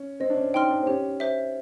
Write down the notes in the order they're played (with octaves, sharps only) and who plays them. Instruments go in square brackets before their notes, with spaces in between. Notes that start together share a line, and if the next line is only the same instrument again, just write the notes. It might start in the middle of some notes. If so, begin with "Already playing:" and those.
Already playing: [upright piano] C#4
[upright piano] C4 [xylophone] D#5
[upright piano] D4
C#4
[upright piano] D#4 [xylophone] G5 C6 F6
[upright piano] D4
C4
[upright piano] C#4 [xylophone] G4
[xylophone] C5 E5